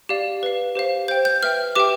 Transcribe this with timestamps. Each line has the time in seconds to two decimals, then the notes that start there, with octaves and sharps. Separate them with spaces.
0.09 G4 D5 F5
0.43 B4 F5
0.75 G4 C5 F5
1.08 C5 G5 G6
1.25 G6
1.43 B4 E5 G5 F6
1.75 G4 B4 E5 G5 D6